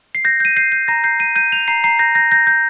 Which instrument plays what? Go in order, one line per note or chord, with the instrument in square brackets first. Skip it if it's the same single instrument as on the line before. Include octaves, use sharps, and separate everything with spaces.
[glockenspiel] C7
G6 A#6
G6 D#7
G6 C7
G6
A#5 A#6
G6 C7
G6 D#7
G6 D#7
G6 F7
A#5 C7
A#5 C7
G6 A#6
G6 A#6
G6 A#6
G6